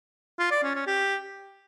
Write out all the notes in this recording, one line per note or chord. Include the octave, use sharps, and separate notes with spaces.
F4
D5
C#4
C#4
G4